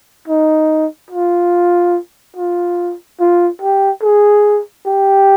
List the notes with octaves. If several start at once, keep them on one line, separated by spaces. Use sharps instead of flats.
D#4
F4
F4
F4
G4
G#4
G4